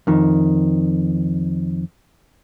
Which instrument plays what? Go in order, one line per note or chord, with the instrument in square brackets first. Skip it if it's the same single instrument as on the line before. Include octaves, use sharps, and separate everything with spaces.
[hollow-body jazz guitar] F2 D#3